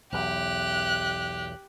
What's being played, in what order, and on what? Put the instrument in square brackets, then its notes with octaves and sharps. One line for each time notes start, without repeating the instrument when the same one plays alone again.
[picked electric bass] B1 E2 [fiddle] G4 [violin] F#6